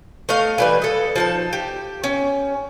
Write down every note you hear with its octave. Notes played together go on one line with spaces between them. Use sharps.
A3 D#5 F5
E3 G3 B4
A4 D#5
F3 D#4 A5
G4
C#4